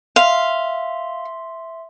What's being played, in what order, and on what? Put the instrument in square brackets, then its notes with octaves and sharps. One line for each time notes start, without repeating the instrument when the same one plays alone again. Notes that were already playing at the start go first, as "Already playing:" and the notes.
[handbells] E5 C6 [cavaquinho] F5